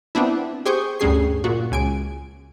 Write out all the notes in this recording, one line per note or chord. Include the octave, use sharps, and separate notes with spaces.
B3 C4 D4 E4
G4 G#4 C5 C#6 D#6 G6
D2 G2 C#4 G#4 C7
A#2 F#4
C#2 G#5 D7